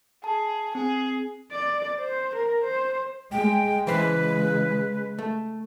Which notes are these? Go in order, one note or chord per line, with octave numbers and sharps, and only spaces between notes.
G#4 A5
C4 G#4
D5
C5
A#4
C5
G#3 G5
C#3 E3 G#3 B4 C5
A3